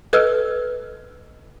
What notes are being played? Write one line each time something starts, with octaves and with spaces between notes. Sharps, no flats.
A4 B4 D#5 E6 F6